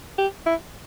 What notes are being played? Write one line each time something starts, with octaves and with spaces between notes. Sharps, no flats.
G4
E4